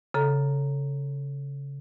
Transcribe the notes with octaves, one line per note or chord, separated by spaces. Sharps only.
C#3 A4 A#5